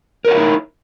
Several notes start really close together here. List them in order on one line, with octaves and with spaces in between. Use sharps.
A#4 C#5 F#5 E4 D#4